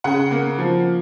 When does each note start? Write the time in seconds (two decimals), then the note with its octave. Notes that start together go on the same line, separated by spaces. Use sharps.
0.04 C#3 F#5
0.31 A#3
0.58 F3